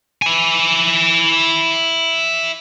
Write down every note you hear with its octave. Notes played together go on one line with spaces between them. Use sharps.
E4 G#5